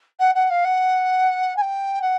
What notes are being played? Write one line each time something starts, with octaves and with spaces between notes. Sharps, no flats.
F#5
F#5
F5
F#5
G#5
G5
F#5